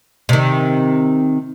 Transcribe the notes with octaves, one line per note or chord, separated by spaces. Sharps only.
C3 D#3